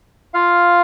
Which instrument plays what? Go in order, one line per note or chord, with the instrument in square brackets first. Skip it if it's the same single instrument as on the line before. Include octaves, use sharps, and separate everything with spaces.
[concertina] F4 F5